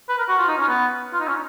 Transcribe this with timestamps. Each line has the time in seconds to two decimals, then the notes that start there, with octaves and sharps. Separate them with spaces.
0.09 B4
0.18 A#4
0.29 F#4
0.38 F4
0.48 D#4
0.58 C#4
0.68 B3
1.13 F4
1.20 D#4
1.28 C#4